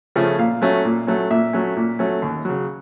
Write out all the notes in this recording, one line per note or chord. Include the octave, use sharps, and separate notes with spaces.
C#3 F3 A3 C#4
A#2 F5
F#3 A3 C#4
A#2
F#3 A3 C#4
A#2 E5
F#3 A3 C#4
A#2
F#3 A3 C#4
D#2
C#3 F#3